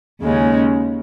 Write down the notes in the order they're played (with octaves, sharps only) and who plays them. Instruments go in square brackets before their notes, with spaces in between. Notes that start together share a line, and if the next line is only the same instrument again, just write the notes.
[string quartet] D#2 C#3 G#3 C#4